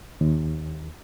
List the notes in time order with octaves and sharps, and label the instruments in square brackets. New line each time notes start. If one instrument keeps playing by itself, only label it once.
[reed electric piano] D#2